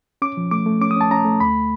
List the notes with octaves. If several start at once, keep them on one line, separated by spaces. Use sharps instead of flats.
C#4 D6
F3
A3 D6
A3
C#4 D6
D#6
C#4 A5
C#4 A#5
A3
D2 B5